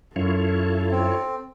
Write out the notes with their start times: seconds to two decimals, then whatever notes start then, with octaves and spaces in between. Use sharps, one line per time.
0.16 F#2 E4 F4 A4 C#5
0.92 C4